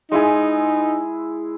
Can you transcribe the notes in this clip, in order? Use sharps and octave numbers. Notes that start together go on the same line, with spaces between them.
G#3 D#4 E4 G#4